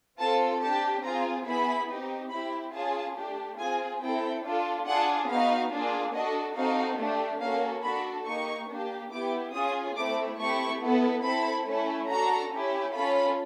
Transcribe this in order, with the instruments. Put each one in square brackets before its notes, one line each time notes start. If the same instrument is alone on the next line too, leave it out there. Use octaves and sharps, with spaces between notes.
[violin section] C4 F4 A4 A5
D4 G4 A5
C4 F4 G#4 A#5
B3 E4 G#4 B5
C4 D#4 G4
C4 E4 G4 B5
C#4 F4 G#4 A5
A3 D4 G4
C4 F4 G#4 G#5
C4 E4 A4 G5
D4 F4 A4
D4 F4 G#4 F#5
B3 D#4 F#4 F5
A#3 D4 F4 G#4
D4 F#4 A4 D#5
C4 D#4 F#4 A4 F5
A3 D4 G4
A#3 C#4 F#4 A4 F5
D4 F#4 A4 B5
A#3 D#4 G4 C#6
A#3 D4 G4
B3 E4 G4 D6
C#4 F4 G#4 D#6
A3 C4 E4 D6
A3 C4 E4 G4 C#6
B3 E4 A4
C4 E4 A4 B5
A3 C#4 E4 A4
D4 F#4 A4 A#5
C#4 E4 G4
C#4 F4 A4 B5